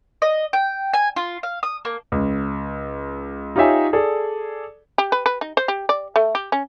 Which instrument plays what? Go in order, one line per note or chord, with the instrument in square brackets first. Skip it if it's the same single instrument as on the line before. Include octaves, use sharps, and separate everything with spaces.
[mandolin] D#5
G5
G#5
F4
F5
D#6
A#3
[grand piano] C#2
D#4 F4 G4 C#5 E5 G#5
G#4 A4 D5
[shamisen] G4
B4
B4
D#4
C5
G4
D5
A3
G4
C#4